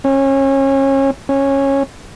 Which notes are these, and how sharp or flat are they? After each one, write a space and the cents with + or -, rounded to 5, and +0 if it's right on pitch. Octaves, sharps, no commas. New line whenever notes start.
C#4 -30
C#4 -15